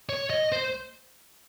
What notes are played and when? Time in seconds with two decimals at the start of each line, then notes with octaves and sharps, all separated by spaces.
0.09 C#5
0.30 D#5
0.52 C5